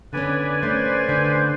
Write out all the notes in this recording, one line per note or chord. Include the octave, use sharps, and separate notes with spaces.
D3 B3 C#4 B4 D5 G#5
A3 C#4 C5
D3